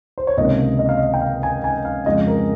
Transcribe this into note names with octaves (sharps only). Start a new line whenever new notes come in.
C5
C#5
C#2 C3 D#3 A#3 D#5
D#5
F5
D#5
G5
F5
G#5
G#5
F5
F2 C#3 G#3 D#5
A#4